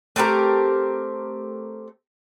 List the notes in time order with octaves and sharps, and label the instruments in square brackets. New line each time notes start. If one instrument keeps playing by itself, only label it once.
[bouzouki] A3 C4 G4 A#4